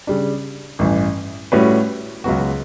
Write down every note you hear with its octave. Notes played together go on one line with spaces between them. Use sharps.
C#3 G3 D4
A1 G2 E3
A2 G3 C#4 F#4 B4
C#2 C#3 F#3 B3 F#4